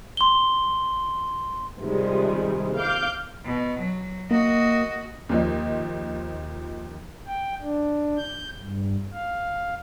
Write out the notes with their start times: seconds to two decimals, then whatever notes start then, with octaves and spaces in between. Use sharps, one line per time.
0.17 C6 G7
1.81 C3 D#3 F3 G3 G#3
2.78 F5 D6 G6
3.45 B2
3.80 F#3
4.31 A#3 F#4 D#5
5.29 D#2 F3 D#5
7.27 G5
7.61 D4
8.18 G6
8.61 G2
9.13 F5